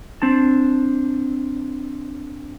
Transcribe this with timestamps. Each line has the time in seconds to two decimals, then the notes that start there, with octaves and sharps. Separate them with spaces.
0.22 C4 D4 A5